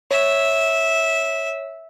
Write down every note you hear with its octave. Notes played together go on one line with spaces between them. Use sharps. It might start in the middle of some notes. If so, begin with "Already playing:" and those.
C#5 E5